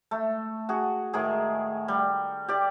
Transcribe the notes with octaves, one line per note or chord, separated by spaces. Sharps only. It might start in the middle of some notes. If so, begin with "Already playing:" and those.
A3
F#4 G#4
A2 D#3 G#4
G3
G4 D5